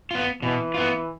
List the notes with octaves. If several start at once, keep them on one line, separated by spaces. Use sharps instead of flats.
B3 F4
B2 E3
B3 F4